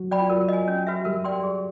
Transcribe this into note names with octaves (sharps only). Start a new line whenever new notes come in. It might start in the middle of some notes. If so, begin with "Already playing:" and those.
Already playing: F#3 F#4
D5 G5 B5
F4
F#3 F#4 A#4
D#5 G#5
C#4
F#4 B4 E5
G3 G4 A#4
D5 G5 C6
G#4